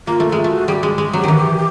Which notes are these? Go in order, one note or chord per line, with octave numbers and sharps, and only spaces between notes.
A#3 F4
A3
G#3 F4
A3 F#4
G3 G4 G#4
G#3
G#3
F#3
D#3 E3